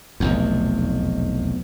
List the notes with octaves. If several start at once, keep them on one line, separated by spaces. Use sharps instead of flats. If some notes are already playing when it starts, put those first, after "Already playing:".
F1 B1 E2